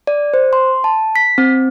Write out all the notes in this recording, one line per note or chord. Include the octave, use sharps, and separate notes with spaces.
D5
C5
C6
A5
B6
C4